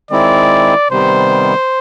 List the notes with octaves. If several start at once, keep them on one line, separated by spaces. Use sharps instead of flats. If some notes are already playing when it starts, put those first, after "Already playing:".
D#3 G#3 C4 E4 D5
C3 D#3 G3 B3 C5